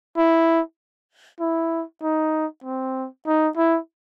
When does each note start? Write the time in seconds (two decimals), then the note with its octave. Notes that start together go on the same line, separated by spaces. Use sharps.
0.17 E4
1.40 E4
2.03 D#4
2.64 C4
3.27 D#4
3.57 E4